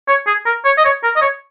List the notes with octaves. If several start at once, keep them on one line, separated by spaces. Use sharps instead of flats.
C#5
G#4
A#4
C#5
D#5
C#5
A#4
D#5
C#5